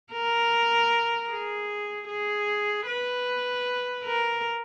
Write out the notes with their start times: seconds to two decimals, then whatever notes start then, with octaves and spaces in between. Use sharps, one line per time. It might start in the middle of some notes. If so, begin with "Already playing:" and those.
0.13 A#4
1.31 G#4
2.08 G#4
2.87 B4
4.04 A#4